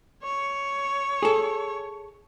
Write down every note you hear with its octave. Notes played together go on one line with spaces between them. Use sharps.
C#5
G#4 A4